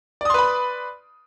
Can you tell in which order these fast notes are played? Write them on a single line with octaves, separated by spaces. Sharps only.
D5 D#6 C6 B4 B5